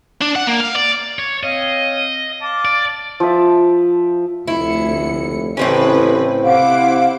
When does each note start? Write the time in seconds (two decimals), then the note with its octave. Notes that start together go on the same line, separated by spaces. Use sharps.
0.21 D4
0.36 F#5
0.47 A#3
0.60 F5
0.76 D5
1.19 C#5
1.43 C4 C#5 D#5 F5
2.41 F5 A5 D6
2.65 D5
3.20 F3 E5
4.48 F1 D2 E4 C#7
5.57 A1 A2 C#3 C4 C#4 E4 B4
6.44 C3 E4 C5 F5 F#5 D6